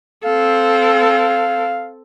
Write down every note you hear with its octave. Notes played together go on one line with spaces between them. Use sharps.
C4 A4 F5